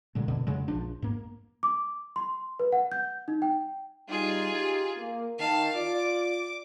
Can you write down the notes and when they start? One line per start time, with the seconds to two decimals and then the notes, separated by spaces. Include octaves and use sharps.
0.15 A#2 D3 G#3
0.28 F#2 B2 D3
0.47 F2 C#3 F#3 G#3
0.68 A#1 F3 D4
1.02 G#2 A#3
1.63 D6
2.16 C6
2.59 B4
2.72 F#5
2.92 G6
3.28 D#4
3.42 G5
4.09 G3 D#4 F4 G#4
4.52 D#4 G4
4.97 A#3
5.39 D#3 F5 A5
5.75 F4 D5 D6